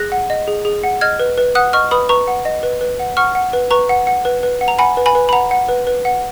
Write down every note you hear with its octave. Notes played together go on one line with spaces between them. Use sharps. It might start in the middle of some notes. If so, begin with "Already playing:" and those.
Already playing: G#4 F#6 A#6
F#5
D#5
G#4
G#4
F#5
D#5 F6 G#6
B4
B4
F#5 D#6 F#6
D#5 C#6 F6
B4 B5 D#6
B4 A#5 C#6
F#5
D#5
B4
B4
F#5
F#5 C#6 F6
F#5
B4
B4 A#5 C#6
F#5
F#5
B4
B4
F#5
A#5
F#5 G#5 B5
B4
G#5 B5
B4
B5
F#5 A#5
F#5
B4
B4
F#5